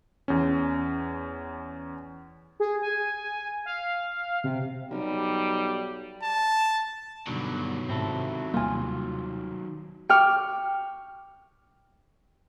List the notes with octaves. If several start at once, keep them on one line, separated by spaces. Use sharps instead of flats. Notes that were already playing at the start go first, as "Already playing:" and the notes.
E2 C#4
G#4
G#5
F5
C3
B1 G3
A5
G2 B2 D3 D#3 F#3
G#2 C3 C4 E4 A4
D#2 C3 G3 A#3 F4 G#5
G5 C#6 D6 F6